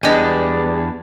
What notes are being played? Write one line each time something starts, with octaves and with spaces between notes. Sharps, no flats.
E2 G3 G#3 B3 D4 G4 D#5 G#5